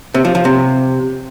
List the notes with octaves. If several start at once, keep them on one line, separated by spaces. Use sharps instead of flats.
C3
F3
F3
C3